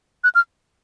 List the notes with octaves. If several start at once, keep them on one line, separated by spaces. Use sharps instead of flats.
F#6
F6